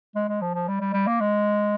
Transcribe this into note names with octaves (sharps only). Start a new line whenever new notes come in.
G#3
G#3
F3
F3
G3
G3
G3
A#3
G#3